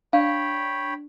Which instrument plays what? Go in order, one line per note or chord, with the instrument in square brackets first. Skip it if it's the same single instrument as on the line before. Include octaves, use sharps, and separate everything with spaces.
[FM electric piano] D4 [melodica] C#5 G5 B5 [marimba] F5